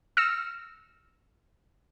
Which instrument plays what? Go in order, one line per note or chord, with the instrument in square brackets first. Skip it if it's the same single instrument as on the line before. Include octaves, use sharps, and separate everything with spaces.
[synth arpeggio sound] E6 F6 A#6 C#7 E7